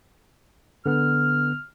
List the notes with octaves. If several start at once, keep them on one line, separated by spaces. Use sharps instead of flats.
D3 B3 F6